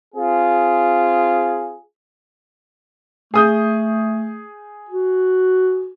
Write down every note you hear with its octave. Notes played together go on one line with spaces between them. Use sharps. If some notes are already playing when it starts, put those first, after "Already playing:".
C4 F4 G#4
A3 G#4 D#6 G6
F#4